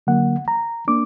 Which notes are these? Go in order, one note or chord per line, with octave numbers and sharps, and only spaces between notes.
D3 F#3 A#3 F#5
A#5
A#3 D4 D6